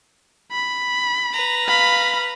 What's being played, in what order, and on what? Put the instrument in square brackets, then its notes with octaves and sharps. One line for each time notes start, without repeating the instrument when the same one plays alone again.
[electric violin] B5
[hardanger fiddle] B4 A#5
[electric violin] F5 B5